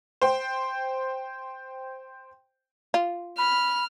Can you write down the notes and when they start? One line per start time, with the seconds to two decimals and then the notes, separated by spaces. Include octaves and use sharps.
0.22 C5 G5
2.94 F4
3.38 B5 F6